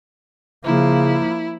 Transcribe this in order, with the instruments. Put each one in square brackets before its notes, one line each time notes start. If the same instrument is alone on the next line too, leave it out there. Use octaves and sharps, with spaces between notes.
[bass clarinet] C#3 [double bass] F3 A#3 [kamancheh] E4